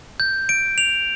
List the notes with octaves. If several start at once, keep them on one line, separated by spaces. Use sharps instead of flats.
G6
D7
F7